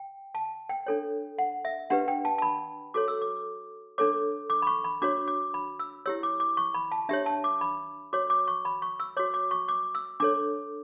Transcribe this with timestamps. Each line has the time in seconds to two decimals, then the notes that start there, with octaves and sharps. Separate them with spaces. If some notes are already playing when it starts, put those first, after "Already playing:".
Already playing: G5
0.35 A5
0.69 G5
0.87 D4 A4 C#5
1.38 F#5
1.65 E5
1.90 D4 G4 B4 F#5
2.08 G5
2.25 A5
2.38 A5
2.42 B5
2.94 F#4 A4 C#5 D6
3.08 E6
3.21 D6
3.98 D4 A4 C#5 D6
4.50 D6
4.62 B5
4.67 C#6
4.84 B5
5.02 D4 F#4 C#5 D6
5.28 D6
5.54 B5
5.80 E6
6.06 E4 G4 C#5 E6
6.23 D6
6.40 D6
6.57 C#6
6.74 B5
6.92 A5
7.09 D4 G4 C#5 E5
7.26 A5
7.44 D6
7.61 B5
8.13 F#4 C#5 D6
8.30 D6
8.48 C#6
8.65 B5
8.82 C#6
9.00 E6
9.17 F#4 C#5 D6
9.34 D6
9.51 C#6
9.68 D6
9.95 E6
10.20 D4 A4 C#5 D6